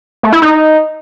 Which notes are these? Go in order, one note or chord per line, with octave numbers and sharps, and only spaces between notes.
A3
E4
D#4